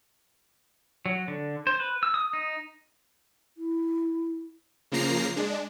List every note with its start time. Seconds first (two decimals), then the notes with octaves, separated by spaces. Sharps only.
1.06 F#3
1.28 D3
1.67 C5
1.80 B4
2.03 E6
2.14 D#6
2.33 D#4
3.57 E4
4.92 C#3 F3 A#3 A#5 C7
5.36 G#3 D4